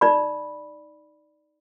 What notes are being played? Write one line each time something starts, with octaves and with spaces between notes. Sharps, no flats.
D#4 D5 B5